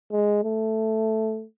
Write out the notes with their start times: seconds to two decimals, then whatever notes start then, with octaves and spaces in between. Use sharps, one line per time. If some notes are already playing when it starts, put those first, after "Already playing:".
0.12 G#3
0.44 A3